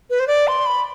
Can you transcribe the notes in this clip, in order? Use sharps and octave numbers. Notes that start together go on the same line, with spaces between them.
B4
C5
D5
C6
B5